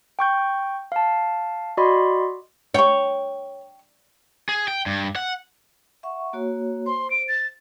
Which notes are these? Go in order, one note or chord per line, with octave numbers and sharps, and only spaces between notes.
G5 C#6 G6
F5 A5
F#4 D5 D#5 B5 C6
C#5 G5 C#6
G#4
G5
G2
F#5
E5 F#5 C#6
A#3 F#4 C#5
C5 C6
D7
A6